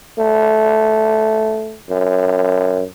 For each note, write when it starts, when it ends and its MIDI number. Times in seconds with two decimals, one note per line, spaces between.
0.19 1.77 57
1.90 2.84 42